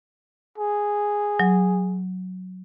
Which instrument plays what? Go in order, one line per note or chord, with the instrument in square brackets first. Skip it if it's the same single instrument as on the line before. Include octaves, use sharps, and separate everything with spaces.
[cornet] G#4
[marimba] F#3